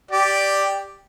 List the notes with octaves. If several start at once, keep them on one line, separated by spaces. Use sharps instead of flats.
G4 D5